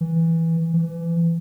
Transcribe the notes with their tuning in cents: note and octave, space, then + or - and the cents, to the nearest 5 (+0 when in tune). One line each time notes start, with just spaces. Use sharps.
E3 -5
E3 +30